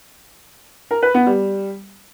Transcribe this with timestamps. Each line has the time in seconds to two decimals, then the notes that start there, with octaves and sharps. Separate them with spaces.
0.91 A#4
1.02 B4
1.14 B3
1.26 G3